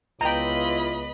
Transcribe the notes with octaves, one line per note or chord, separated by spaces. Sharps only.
C#2 B3 E4 F4 D#5 G5 A#5 B5